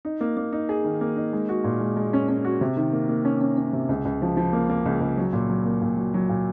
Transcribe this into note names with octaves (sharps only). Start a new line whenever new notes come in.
D#4
A#3
A#3
D#4
G#4
D#3
A#3
D#4
G#3
F#4
A#2
G#3
G#3
C#4
C#4
F#4
C3
D#3
A#3
A#3
C#4
C#4
C#4
C3
C#2
C#2
F3
F3
A#3
A#3
C#2
C#2
F#3
A#2
F#3
A#3
A#2
F#3
F#3
A#2